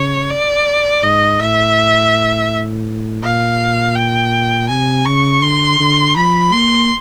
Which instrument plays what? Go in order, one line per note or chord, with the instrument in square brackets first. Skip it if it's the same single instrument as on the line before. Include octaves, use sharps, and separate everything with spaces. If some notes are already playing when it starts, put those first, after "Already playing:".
Already playing: [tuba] C#3 [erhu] C#5
[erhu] D5
[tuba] G#2 [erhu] D#5
[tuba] A2 [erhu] E5
[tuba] A#2 [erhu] F5
[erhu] G5
[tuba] C3 [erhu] G#5
[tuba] C#3 [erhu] C#6
[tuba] D3 [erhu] C6
[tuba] D3
[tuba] F3 [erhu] B5
[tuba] A#3 [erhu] C6